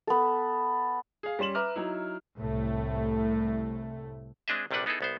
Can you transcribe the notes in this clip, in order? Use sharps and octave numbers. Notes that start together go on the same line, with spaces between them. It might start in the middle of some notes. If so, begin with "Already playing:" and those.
B3 A4
G#4 F5
G3 C#4 C6 E7 F#7
B4 E5 A#5 D6 F6
F#3 D#4 E4
C2 A2 A3
G#3 C4 D4 G#4 D#5 E5
A#1 C3 G3 D4 B4 F#5
B3 D#4 E4 G#4 A4
C2 B3 C5